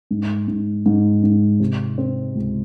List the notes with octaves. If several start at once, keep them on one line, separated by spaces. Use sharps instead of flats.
G#2
G#2
G#2
G#2
C3
C4
C#2